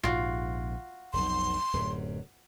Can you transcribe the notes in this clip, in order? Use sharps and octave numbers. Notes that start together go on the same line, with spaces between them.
A#1 G#2 C3 F4 F#4
F1 B1 C6
D1 F#2 C3